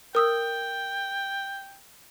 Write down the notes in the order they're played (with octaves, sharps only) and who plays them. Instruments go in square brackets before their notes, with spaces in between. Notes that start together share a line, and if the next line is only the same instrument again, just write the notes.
[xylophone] A#4 D#6 E6 [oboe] G5